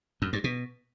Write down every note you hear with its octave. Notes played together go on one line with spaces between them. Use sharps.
F#2
G2
B2